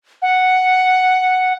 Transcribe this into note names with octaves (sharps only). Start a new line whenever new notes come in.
F#5